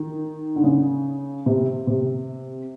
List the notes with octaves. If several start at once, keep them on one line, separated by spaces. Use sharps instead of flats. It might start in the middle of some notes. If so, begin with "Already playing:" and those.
Already playing: D#3
D3
C#3
C3
C3